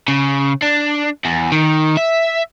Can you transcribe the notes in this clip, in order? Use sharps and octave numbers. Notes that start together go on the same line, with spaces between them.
C#3
D4
E2
D#3
E5